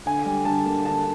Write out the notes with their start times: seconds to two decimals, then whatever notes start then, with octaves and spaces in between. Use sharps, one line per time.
0.06 D3 G#5
0.26 G3
0.45 D3 A5
0.66 A#3
0.85 D3 A5